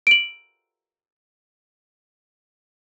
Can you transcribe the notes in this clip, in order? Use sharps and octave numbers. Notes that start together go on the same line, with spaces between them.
D7 F#7